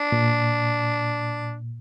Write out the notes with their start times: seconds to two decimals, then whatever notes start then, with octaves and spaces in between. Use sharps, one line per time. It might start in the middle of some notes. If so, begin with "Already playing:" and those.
Already playing: D4
0.12 A#2